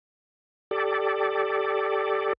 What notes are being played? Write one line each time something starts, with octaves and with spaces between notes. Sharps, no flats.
G4 A4 D5